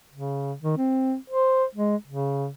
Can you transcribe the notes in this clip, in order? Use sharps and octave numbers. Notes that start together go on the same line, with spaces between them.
C#3
D#3
C4
C5
G#3
C#3